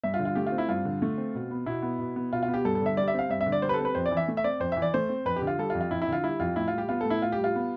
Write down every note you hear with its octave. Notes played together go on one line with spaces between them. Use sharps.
G2 E5
F4
D3
F4
A3 G4
F4
C4
E4
G2 F4
D3
A3
C4
B2
B3
B2 E4
B3
B2
B3
B2 F4
F4
B3
G4
G2 A4
A4
D3 E5
G3 D5
E5
C4 F5
G2 E5
E5
D3
D5
G3 C5
B4
A4
C4
B4
F2 C5
D5
E3
E5
A3
E5
C4 D5
F2 C5
E3 E5
D5
A3 C5
C4
F2 B4
G4
D3
F4
G3 A4
F4
F2
F4
F2 E4
E4
D3 F4
G3 E4
F2 F4
A2 E4
G3 F4
G4
B3 F4
A2 A4
E4
A2 F4
G4
G3
F4
B3